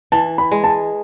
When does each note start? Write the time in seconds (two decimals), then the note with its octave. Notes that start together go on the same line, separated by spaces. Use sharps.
0.12 E3 A5
0.38 B5
0.52 G#3
0.64 A5